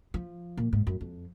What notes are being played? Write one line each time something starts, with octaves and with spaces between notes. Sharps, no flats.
F3
A#2
G#2
F#2
F2